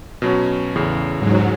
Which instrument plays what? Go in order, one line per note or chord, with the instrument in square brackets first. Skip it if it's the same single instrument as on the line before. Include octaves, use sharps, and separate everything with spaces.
[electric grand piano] B2 F#3 C#4
E2 A2 C#3
[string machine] G#2 F#3